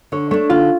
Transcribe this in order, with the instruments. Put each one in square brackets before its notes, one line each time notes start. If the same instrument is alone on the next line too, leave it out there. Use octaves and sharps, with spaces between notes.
[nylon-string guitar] D3 [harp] C#5
[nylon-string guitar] A3 D4 [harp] C#5
[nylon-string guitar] D3 [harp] F4